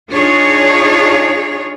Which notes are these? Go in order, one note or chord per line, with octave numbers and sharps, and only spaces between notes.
D4 D#4 F4 G#4 C#5